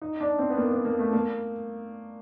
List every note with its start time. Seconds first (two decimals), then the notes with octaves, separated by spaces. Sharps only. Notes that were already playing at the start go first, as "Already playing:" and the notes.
0.02 D#4
0.20 D4
0.39 C4
0.50 B3
0.57 A#3
0.71 B3
0.85 A#3
0.99 A3
1.13 A#3